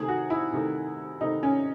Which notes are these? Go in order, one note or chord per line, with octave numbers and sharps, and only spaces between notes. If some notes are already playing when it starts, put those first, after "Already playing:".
Already playing: C3 D#3 A3 G#4
F#4
E4
C3 D#3 A3
C3 D#3 A3 D#4
C#4